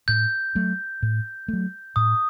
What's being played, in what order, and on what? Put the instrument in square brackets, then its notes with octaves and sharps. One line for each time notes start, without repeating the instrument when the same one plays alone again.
[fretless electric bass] A2 [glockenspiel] G6
[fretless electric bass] F#3 A3
A2
F#3 A3
[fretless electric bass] A2 [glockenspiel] D#6